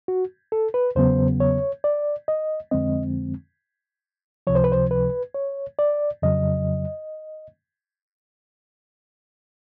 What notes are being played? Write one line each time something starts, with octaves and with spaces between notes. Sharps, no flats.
F#4
A4
B4
E2 C#3 F#3 B3 C5
C#5
D5
D#5
F2 D3 F3 G#3 C4 D#5
C#2 C3 F3 C#5
C5
B4
C5
B4
C#5
D5
F2 C#3 F#3 D#5